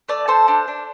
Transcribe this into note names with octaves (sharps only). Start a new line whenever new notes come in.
A3 D5
A4 C5
D4
D4